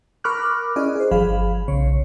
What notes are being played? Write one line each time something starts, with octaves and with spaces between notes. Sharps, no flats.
A#4 B5 C#6 D6 F6 F#6
C#4 E4 G#4 D5 D#5
G#4 C5
G1 F3 G#4 F5 B5
B1 C#3 C#5